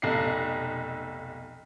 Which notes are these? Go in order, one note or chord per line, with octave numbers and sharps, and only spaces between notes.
F1 B1 D#5 C7